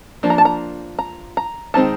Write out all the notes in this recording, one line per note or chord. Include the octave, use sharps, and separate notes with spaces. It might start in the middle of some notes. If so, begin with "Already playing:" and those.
F3 A#3 D4
A#5
A5
A#5
A#5
A#5
D#3 G#3 C4 D#4 A5